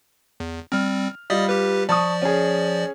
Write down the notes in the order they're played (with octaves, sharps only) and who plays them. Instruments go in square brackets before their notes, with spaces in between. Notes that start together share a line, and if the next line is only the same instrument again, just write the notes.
[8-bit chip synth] E2
[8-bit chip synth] G3 C4 [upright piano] F6
[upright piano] G3 F4 [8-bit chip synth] D5 D#5 D#6
[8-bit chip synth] G4 B4
[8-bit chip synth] F3 D5 [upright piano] A5 C#6 D#6
[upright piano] C#4 G#4